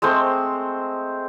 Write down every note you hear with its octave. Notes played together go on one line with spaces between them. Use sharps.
G#3 A3 C4 C5